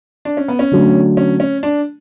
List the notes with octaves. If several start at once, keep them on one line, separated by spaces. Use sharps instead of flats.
D4
C#4
B3
C#4
D3 F#3 A3
C#4
C#4
D4